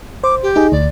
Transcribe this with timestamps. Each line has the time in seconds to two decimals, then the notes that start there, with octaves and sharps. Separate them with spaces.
0.24 C5 D6
0.43 G4
0.56 D#4 G#4 D#5
0.72 D2 D5